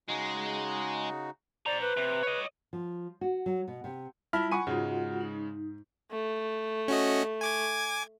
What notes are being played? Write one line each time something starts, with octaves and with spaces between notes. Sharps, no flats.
C#3 G#3 D#4 F#4
C5 D5 A#5
B4
C3
C#5 D#5
F3
F#4
F#3
B2
C3
G3 E4 F4 A5 B5 F6
F#5 G#5 B5 C#6 D#7
G#2 C#3 G#3 F4 F#4 F#5
D#4
A3
C#4 F#4 D#5
G#5 D6 G#6